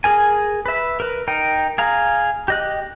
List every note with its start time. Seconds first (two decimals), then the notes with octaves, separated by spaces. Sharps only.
0.04 G#4 A#4 G#5
0.66 B4 E5
1.00 A#4 B4
1.28 D#4 A#4 G5
1.78 G#4 F5 A#5
2.48 G4 D#5 F#6